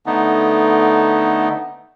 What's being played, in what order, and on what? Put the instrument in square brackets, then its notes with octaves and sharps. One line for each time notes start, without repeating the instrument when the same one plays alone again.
[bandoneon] D3 A3 B3 D#4